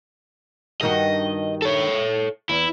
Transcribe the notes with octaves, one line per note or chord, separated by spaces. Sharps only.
G2 D#3 F#4 D#5
A4 C#5
E2 E4